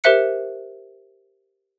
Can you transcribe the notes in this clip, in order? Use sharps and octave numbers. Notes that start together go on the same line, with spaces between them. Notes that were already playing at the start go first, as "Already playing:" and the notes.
G4 A#4 C5 E5 F#6 C#7